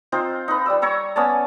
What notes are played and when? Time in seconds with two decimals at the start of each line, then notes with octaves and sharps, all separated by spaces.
0.12 C4 D#4 F4 C5
0.48 D#4 B4
0.66 G3 D5 E6
0.82 C#5 A#5 C#6 E6
1.16 B3 C#4 D5 A5